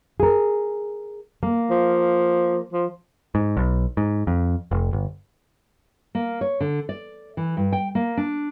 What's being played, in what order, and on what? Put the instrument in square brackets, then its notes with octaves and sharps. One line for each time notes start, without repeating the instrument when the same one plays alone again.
[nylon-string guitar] G#4 A#4
A#3
[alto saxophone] F3
F3
[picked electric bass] G#2
B1
G#2
F2
F1
G1
[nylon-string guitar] A#3
C#5
D3
D5
E3
G2
G5
A#3
D4